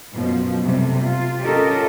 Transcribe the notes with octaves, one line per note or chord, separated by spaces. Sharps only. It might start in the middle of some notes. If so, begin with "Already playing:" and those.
F#2 B2 F3
C3 G3 A3
F4
C#4 F4 G4 A4 A#4 D#5